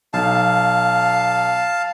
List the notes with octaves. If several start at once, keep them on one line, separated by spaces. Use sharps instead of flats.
B1 F5 A5